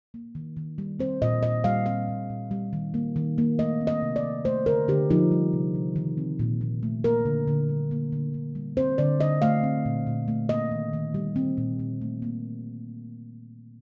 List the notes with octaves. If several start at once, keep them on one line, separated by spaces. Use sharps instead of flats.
A#3
D#3
D#3
G3
C4 C5
A#2 D#5
A#2 D#5
G3 F5
C4 F5
A#2
A#2
G3
D#3
A#3
D#3
A#3
A3 D#5
C4
D#5
C3
D5
D#3
A3 C5
D3 A#4
D3 G4
F3 D#4
G3
C3
C3
D#3
C4
A#2
A#2
A3
A#3 A#4
D3
D3
G3
A#3
D3
D3
G3
C4 C5
D3 D5
D3 D#5
A3 F5
C4
A#2
A#2
A3
A#3 D#5
D#3
D#3
G3
C4
A#2
A#2
A3
A#3